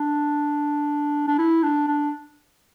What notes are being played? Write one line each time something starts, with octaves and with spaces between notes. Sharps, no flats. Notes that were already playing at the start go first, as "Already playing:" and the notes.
Already playing: D4
D4
E4
D4
D4